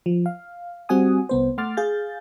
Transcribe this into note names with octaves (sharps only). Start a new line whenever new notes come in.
F3
F5
G3 C4 F#4 F#5 G#5 D#6
C2 B3 C5
A3 F#5 C6 D6 F6 A6
G#4 F5 G6 A6